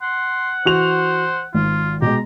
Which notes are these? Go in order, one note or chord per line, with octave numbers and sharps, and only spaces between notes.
F#5 C6
E3 F#4 C5 F7
G#1 F4
B2 G#3 G4 A#5